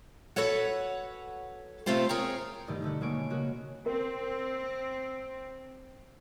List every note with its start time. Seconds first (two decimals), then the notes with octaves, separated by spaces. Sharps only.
0.36 F#4 A4 B4 C#5 F#5
1.86 C3 A3 C4 F4 G4 C5
2.09 G#4 A#4 C#5 G5 A#5
2.67 G2 B2 D#3 A3 D#4
2.82 D3 A3 F#4
3.01 B2 G#3 A#3 C#5 D7
3.30 C#3 G#3 F#4 A#4
3.86 C4 A#4